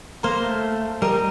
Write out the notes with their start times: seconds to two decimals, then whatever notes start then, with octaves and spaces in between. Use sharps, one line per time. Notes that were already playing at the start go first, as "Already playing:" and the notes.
0.23 A#3 C5 F5 A#5
0.43 A3
1.02 G3 A#4 D#5 A#5